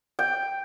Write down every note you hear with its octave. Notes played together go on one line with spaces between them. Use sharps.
G5